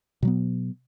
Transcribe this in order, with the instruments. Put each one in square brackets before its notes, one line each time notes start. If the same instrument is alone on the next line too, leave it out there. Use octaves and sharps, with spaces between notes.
[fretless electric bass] B2 F#3 B3